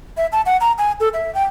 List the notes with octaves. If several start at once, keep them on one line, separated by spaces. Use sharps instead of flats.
E5
A5
F#5
A#5
G#5
A4
E5
G5